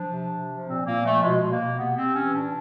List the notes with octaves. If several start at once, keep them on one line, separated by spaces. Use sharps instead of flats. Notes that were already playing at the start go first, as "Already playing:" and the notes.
Already playing: F3 D4
C3
C3
F3
A#2 C4
A#2 A#3
F3 A3
B2 G#3
B2
A#3
B2
C3 B3
C3 C4
E3 C#4
A#2 D4